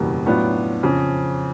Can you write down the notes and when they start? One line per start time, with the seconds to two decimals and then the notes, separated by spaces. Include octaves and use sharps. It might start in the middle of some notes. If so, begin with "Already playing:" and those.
Already playing: F#1 E2 B2 G3 A#3
0.26 A2 F#3 B3 D4 F4
0.83 F2 C#3 F3